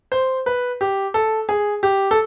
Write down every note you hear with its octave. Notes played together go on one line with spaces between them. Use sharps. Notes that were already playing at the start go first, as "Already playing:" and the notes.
C5
B4
G4
A4
G#4
G4
A4